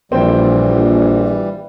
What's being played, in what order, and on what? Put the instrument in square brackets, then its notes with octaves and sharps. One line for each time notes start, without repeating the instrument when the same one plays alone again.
[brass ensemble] A#1 [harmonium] E3 G3 [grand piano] C4 C5 G5